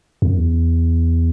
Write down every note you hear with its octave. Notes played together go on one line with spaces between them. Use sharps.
E2
F#2
E2